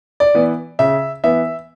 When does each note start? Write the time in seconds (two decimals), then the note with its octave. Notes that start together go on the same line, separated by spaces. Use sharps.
0.20 D5
0.34 E3 B3
0.79 C#3 E5
1.24 E3 B3 E5